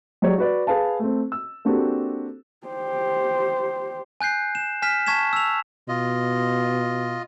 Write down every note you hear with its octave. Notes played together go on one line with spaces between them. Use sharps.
F#3 G#3 G4 C#5 D5
F#4 B4 D5
G#4 B4 F5 A5
A3 C4
E6
A#3 C4 D4 F#4 G4 A4
G4 C5
G#5 F#6 G6 C7
E7
G#5 F6 B6 E7
A5 C#6 G#6 B6 E7
E6 F7
B2 F4 D#5